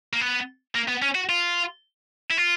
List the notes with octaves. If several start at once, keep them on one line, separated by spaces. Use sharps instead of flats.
A#3
B3
A#3
B3
C#4
F#4
F4
E4
F4